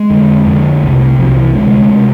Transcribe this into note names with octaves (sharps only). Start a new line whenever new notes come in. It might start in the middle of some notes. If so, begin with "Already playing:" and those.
Already playing: G#3
F2 D3
F2 D3
C2 C3 A3
C2 C3 F3
E3
D2 C3 G#3
C3